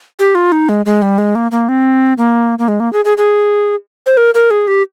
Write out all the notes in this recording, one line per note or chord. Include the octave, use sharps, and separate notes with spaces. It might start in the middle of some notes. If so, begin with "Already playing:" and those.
G4
F4
D#4
G#3
G#3
G3
G#3
A#3
A#3
C4
A#3
A#3
G#3
A#3
G#4
G#4
G#4
C5
A#4
A#4
G#4
G4